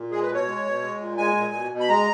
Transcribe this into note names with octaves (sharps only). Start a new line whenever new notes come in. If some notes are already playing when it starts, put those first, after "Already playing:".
Already playing: A#2
G#3 G#4
B4
B2
C#5
G#3
B2
G#3
A#2
G#3 G#5
A#2
B2
B2
B5
G#3 A#5